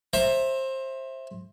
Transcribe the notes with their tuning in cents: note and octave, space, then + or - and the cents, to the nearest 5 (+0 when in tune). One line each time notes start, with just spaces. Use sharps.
C5 +20 E5 +0 A#5 -20